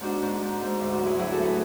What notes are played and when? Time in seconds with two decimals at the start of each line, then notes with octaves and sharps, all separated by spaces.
0.01 G#2 D4 F#4
0.22 G#2
0.41 G#2
0.61 G#2
0.79 D2 D4
0.93 D4 F#4
1.00 F#3
1.05 E4 G#4
1.19 F#3 E4 G#4
1.32 F#4 A4
1.38 A2
1.44 G#4 B4